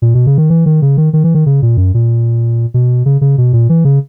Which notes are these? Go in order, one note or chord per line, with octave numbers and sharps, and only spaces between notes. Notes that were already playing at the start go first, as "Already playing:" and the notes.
A#2
B2
C#3
D#3
E3
D#3
C#3
D#3
D#3
E3
D#3
C#3
A#2
F#2
A#2
B2
C#3
C#3
B2
A#2
E3
C#3